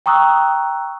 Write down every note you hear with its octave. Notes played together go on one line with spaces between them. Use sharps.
G5 A#5 C#6 D#6 E6 F#6